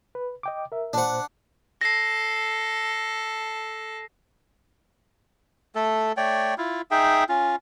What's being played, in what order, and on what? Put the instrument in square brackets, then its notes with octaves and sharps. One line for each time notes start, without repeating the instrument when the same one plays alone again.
[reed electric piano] B4
D#5 G5 D6
A#4 E5
[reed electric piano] A#2 C5 [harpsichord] D4 F#5
[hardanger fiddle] A4 [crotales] A#6 C7
[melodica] A3 A4
A3 C#5 D5 G5
E4 F4
D#4 G#4 E5 G5
C#4 F4